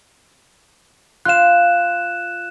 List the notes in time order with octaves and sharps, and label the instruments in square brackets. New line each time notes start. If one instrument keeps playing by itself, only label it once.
[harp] F4 F5 [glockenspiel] F#6 E7